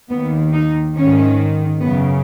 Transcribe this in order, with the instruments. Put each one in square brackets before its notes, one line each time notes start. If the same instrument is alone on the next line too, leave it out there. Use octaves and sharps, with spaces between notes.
[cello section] D#2 D#3 B3
D#4
G#2 D#3 C#4
F#2 C#3 B3